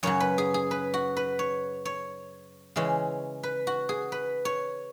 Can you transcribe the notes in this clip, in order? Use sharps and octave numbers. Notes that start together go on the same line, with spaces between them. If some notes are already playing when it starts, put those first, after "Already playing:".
F#2 C#3 F#3 C#5
B4
G#4
G#4
B4
F#4
B4
C#5
C#5
C#3 E3 G#3 C#4
B4
F#4
G#4
B4
C#5